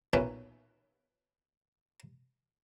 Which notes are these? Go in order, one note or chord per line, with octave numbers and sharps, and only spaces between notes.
B1 A#2 C#4 B4 E5